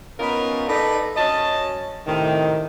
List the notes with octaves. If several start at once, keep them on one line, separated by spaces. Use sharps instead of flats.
B3 C#4 D#4 F4 A#4
D#4 A4 B4 D5
F#2 F#3 C#4 D#5 A5
A2 C3 D#3